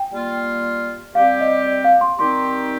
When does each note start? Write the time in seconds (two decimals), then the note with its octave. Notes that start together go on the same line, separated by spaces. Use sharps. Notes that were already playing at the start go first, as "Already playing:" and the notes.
Already playing: G5
0.10 G3 A#3 F4
1.15 G3 C4 G4 F5
1.41 D#5
1.66 D5
1.84 F5
2.01 C6
2.19 D#3 G3 C4 D#4 G4 C6